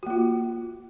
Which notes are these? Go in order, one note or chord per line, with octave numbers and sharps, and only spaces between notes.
A#3 F4 F#4